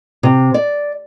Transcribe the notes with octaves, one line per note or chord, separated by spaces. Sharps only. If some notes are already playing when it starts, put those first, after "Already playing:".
C3
D5